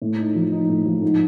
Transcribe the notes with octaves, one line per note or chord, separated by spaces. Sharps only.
A2
D#4
F3
D#4
A2
F3
G#2